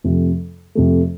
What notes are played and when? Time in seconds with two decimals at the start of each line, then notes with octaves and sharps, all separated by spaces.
0.04 F2 C3 F3 A3
0.75 F2 C3 F3 A3